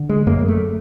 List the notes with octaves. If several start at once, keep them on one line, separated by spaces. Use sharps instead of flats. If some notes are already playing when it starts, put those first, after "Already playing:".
Already playing: D3
G#3
F#2 A#3
A3